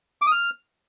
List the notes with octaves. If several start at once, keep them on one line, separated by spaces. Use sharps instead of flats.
D6
D#6
F6